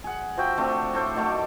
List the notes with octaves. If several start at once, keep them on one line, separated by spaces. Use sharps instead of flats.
G#4 F#5
F3 F#4 E5 G5
A3 C4 D4
A2 A4 C5 D6
D#3 F#3 A3 D6